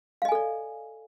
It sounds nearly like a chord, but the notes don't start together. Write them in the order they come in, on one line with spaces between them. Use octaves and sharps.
F5 D#5 G#5 A4 D5